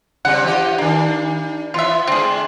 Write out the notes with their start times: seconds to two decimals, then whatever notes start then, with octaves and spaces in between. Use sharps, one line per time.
0.25 C#3 G3 C4 F#5
0.44 E3 G4 D#5
0.78 D#3 A#3 D4
1.74 E3 B3 F4 E5
2.07 D3 G#3 C4 G#4